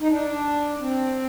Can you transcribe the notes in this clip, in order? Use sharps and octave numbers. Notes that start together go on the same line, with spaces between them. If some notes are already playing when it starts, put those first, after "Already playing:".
D#4
D4
C4